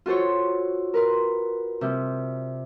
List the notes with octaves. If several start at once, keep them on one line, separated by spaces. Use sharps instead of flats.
F4 F#4 A4 C5 C#5
A#4 B4 C6
C3 G3 G6